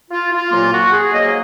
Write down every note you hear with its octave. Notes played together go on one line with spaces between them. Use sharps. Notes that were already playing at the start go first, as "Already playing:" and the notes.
F4
F4
C2 A#2 F#3 A#3 F4
F#4
G#4
G#2 F#3 A#3 D#5